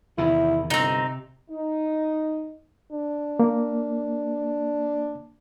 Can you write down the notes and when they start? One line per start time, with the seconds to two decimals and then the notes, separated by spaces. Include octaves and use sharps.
0.18 E2 C3 D#3 E4
0.70 G1 C3 C4 D#4
1.50 D#4
2.92 D4
3.39 A#3